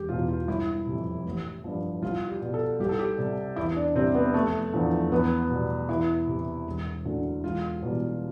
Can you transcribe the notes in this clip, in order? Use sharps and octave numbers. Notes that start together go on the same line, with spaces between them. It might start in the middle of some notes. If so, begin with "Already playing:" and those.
Already playing: E1 G4
E2 B2 F4
F4
G1 E4
F2 C3
A1
G2 F3
C2 F4
G4
B2 G3
A4
C2 G4
A4
G4
C3 G3
E2 E4
D4
C3 G3 C4
B3
F1 A3
E2 D3 F3
E2 B3
B2 G3
E2 E4
C3 E3
E1
D2 D3
E1 F4
E2 B2 G3